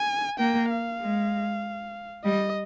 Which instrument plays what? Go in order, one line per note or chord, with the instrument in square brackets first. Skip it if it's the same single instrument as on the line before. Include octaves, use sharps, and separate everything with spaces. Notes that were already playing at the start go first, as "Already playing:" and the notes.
Already playing: [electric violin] G#5
[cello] A#3 [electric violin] G5
[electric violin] F5
[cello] G#3
[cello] G3 [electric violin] D#5